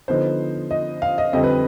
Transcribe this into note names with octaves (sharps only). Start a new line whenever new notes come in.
D3 F3 B3 D#4 C5
D#5
F5
D#5
F2 D3 G3 C4 D#5
B4